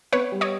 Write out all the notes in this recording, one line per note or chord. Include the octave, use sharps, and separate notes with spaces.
B3 B4 C#5
G3
C#5 D#5